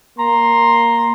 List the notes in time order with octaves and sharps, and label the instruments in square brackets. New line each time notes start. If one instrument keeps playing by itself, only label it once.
[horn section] A#3 A#5 C6